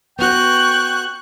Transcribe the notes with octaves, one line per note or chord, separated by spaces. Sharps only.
B3 F#4 G5 C#6 F#6